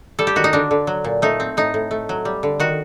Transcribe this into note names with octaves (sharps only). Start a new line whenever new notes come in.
G3 A4
G4
D#3 F#4
D#4
D3 D4
D3
F#3
A#2
A3 D#4
C4
A2 D#4
A2
A3
F#3
G3
D3
D#3 F#4